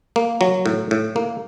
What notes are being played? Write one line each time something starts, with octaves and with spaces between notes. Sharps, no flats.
A#3
F#3
A2
A2
A#3